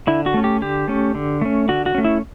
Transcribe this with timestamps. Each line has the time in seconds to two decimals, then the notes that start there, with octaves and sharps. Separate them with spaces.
0.07 D3 E4
0.26 F#4
0.34 A3 C#4
0.44 G4
0.62 D3 G4
0.88 A3 C#4
1.15 D3
1.41 A3 C#4
1.68 D3 F#4
1.86 F#4
1.95 A3 C#4
2.04 E4